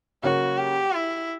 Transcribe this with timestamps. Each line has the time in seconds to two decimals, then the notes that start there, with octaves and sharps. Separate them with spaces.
0.23 C#3 F#3 A#3 C#4 F#4
0.58 G4
0.93 E4